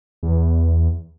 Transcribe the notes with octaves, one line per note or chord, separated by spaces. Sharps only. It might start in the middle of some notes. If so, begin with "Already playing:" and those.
E2